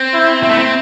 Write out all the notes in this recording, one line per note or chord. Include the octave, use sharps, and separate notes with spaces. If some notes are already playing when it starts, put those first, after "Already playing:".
Already playing: C4
E4
C4 E4
A3
C4